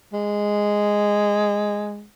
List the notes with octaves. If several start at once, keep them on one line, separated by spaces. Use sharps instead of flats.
G#3